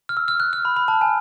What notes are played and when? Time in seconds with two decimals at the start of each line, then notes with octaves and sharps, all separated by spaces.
0.09 F6
0.17 E6
0.28 F6
0.40 F#6
0.53 F6
0.65 B5
0.76 B5
0.88 A5
1.01 G#5